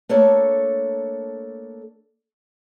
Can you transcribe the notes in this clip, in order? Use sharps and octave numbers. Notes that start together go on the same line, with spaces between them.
A3 A#3 D4 A4 C#5